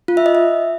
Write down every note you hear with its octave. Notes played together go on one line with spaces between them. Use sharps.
F4
E5
D#5
E5